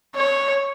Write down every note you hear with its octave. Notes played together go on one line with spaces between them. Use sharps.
C#5